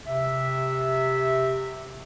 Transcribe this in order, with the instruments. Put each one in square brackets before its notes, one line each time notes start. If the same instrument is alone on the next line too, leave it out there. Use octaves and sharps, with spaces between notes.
[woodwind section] C3 E5